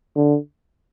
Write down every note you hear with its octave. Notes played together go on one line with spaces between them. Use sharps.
D3